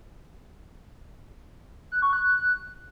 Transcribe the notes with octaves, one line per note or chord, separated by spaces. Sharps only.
F#6
C#6
F#6